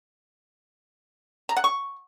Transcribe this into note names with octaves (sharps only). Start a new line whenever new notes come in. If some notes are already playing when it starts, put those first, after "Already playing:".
A#5
F#5
C#6